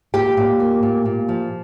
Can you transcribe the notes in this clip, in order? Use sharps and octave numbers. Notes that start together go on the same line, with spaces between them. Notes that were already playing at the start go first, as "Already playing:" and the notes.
A#2 G4 G5
A#2
A#3
A#2
A#2
F3